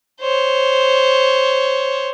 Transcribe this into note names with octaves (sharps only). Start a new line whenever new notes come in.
C5 C#5